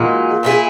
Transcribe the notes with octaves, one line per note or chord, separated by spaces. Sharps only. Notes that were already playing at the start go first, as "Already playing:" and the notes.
Already playing: A#2 E3 G#3 D#4 F#4
A#2 A#3 E4 G#4